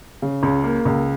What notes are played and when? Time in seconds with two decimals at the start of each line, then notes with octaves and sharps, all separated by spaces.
0.22 C#3
0.43 C#2
0.64 A#3
0.85 C#2